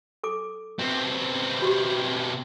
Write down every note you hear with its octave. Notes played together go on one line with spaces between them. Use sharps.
A4 D6
B2 C4
F#4 G4